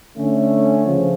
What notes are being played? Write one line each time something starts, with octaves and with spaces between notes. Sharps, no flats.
D3 A3 C#4
C#3 F3